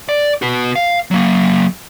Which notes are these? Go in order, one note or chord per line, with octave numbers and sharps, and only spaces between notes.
D5
F#4 B4
F5
F#3 A#3